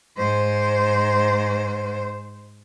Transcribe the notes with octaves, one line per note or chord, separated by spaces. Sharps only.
G#2 C5